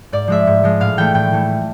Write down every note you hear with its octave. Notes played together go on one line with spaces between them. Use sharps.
G#2 D5
F3 G#3 E5
G#2
F3 G#3
A2 F5
E3 A3 G5
A2 G5
E3 A3